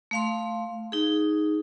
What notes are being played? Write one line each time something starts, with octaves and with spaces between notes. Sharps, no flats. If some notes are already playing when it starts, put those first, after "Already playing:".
A3 F5 C6
D#4 G#4